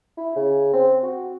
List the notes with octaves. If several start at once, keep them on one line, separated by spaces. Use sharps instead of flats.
E4
C#3
C4
F#4